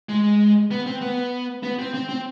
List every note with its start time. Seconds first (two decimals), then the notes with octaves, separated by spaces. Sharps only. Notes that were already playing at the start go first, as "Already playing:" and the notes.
0.09 G#3
0.71 B3
0.86 C4
1.02 B3
1.63 B3
1.79 C4
1.94 C4
2.09 C4